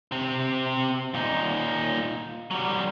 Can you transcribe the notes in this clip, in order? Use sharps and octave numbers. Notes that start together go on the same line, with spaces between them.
C3 C4
A#2 D#4
F#3 G3